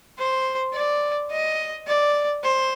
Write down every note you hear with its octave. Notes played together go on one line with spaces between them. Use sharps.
C5
D5
D#5
D5
C5